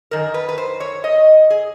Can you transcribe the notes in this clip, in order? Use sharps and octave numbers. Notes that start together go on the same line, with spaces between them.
F#2 D#3 A#4
B4
B4
C5
C#5
D#5
G#4